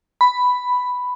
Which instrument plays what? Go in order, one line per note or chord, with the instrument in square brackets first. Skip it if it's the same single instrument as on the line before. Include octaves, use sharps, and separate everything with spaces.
[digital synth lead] B5